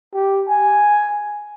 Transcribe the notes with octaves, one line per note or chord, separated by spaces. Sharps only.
G4
G#5